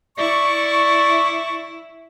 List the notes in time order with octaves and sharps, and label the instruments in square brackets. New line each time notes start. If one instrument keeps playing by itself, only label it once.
[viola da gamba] E4 [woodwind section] D5 C#6